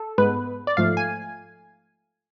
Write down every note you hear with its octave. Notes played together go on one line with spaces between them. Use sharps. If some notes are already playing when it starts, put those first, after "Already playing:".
Already playing: A4
G#2 G#3 B3 B4
D5
G#2 F3 A3 F5
G#5